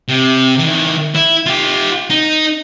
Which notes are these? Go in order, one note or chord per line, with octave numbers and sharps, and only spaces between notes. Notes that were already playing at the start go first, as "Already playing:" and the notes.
C3
D#3 E3
E4
F4 G4
D#4